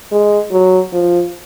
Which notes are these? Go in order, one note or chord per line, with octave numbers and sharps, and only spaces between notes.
G#3
F#3
F3